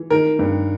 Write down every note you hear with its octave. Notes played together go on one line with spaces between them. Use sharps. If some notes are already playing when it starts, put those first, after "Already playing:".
Already playing: E3
D#3 A#4
G2